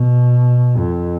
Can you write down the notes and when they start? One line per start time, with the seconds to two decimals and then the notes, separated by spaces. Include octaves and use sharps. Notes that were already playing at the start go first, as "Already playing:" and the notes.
Already playing: B2
0.77 F2